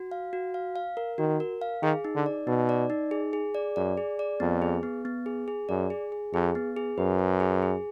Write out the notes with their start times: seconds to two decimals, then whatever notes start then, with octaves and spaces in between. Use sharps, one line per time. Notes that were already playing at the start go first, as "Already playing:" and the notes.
Already playing: F#4
0.11 F5
0.33 F#4
0.54 F5
0.76 F5
0.97 A#4
1.18 D#3 F#4
1.40 A#4
1.62 F5
1.82 D#3 G#4
2.05 D#4
2.15 D3
2.26 D5
2.47 B2 D#4
2.69 D5
2.90 D#4
3.11 G#4
3.33 G#4
3.55 D5
3.76 F#2 D5
3.97 G#4
4.19 D5
4.40 F2 B3
4.62 G#4
4.83 B3
5.05 B3
5.26 G#4
5.48 G#4
5.69 F#2 D5
5.90 G#4
6.12 G#4
6.33 F2 G#4
6.55 B3
6.77 G#4
6.98 F#2 B4
7.19 B4
7.40 G#4
7.62 G#4